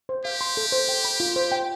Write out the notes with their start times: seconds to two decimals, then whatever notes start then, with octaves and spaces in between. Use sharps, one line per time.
0.09 C5
0.25 G4 F5
0.41 C6
0.57 A4
0.72 C5
0.89 G5
1.05 B5
1.20 F4
1.36 C5
1.52 G5